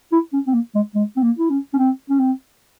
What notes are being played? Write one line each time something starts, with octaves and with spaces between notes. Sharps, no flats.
E4
C#4
C4
A#3
G#3
G#3
C4
A#3
E4
C#4
C#4
C4
C#4
C4